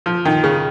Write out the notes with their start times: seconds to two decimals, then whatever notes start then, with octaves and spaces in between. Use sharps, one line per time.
0.06 F3
0.25 D#3
0.44 C#3